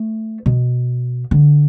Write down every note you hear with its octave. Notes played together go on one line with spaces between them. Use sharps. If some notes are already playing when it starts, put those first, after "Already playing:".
Already playing: A3
B2
D3